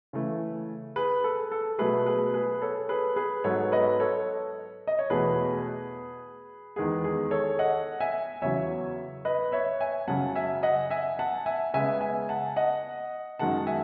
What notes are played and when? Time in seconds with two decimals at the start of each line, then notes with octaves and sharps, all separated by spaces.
0.13 C#3 E3 A3
0.96 G#4 B4
1.24 A4
1.52 A4
1.79 B2 F#3 A3 G#4 B4
2.06 G#4 B4
2.34 G#4 B4
2.62 A4 C#5
2.89 G#4 B4
3.16 G#4 B4
3.44 G#2 F#3 B3 A4 C#5
3.72 B4 D#5
4.00 A4 C#5
4.87 D#5
4.99 C#5
5.10 E2 B2 A3 G#4 B4
6.76 E2 D#3 G#3 B3 G#4
7.04 G#4
7.31 A4 C#5
7.59 D#5 F#5
8.00 E5 G#5
8.42 E2 C#3 F#3 C#5 E5
9.25 B4 D#5
9.52 C#5 E5
9.80 E5 G#5
10.08 F#2 C#3 F#3 F#5 A5
10.36 E5 G#5
10.63 D#5 F#5
10.90 E5 G#5
11.19 F#5 A5
11.46 E5 G#5
11.74 C#3 G#3 B3 E5 G#5
12.01 E5 G#5
12.29 F#5 A5
12.56 D#5 F#5
13.39 F#2 D#3 G#3 F#5 A5
13.67 E5 G#5